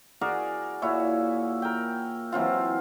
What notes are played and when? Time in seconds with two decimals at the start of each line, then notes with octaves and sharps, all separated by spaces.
0.21 F#4 G#4 A#4 D5
0.82 A#2 E4 F#4 C#5
1.62 A#4 G5
2.32 E3 F#3 C4 F4